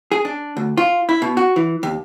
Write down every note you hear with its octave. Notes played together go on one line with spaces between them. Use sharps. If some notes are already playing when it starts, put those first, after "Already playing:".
G#4
D4
D2
F4
E4
B2
F#4
E3
D#2